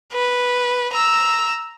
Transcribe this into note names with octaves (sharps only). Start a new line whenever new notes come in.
B4
A#5 E6